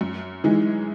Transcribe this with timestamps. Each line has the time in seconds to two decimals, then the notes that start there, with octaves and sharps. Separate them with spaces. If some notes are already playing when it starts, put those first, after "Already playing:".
0.01 F#2
0.44 E3 G#3 D#4